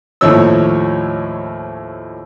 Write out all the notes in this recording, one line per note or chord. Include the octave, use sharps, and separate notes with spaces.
D#2 A2 F3 C#5 E6